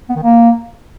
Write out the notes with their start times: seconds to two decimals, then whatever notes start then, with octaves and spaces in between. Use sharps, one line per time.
0.10 B3
0.16 D#3
0.23 A#3